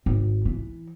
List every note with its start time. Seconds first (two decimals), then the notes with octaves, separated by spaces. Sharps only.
0.06 G#1
0.45 E3